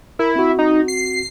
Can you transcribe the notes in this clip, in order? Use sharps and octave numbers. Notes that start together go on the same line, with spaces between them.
E4 A#4
C4 F#4
D#4
C7